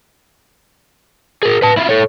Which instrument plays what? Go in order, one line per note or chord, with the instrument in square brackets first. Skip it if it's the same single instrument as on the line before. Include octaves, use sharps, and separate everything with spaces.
[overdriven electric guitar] G#4 A#4
B4 A5
E4 F4
A4 C#5